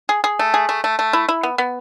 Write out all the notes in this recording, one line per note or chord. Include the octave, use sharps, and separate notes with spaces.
G#4
G#4
A3
G#4
A3
A3
A3
E4
E4
B3
B3